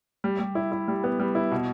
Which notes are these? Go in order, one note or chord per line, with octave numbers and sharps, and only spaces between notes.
G3
G3
E4
E4
G3
B3
G3
E4
B2